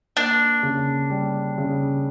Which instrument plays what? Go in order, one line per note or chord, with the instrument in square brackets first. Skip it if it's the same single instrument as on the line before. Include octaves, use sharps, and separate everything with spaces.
[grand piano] A#3 [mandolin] D4
[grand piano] C#3
G3
C#3